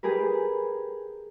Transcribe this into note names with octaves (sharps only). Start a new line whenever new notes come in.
G4 G#4 A#4 B4